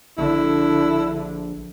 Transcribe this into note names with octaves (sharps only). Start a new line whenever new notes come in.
A#1 D3 E4